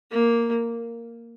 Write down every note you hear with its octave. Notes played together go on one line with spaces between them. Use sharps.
A#3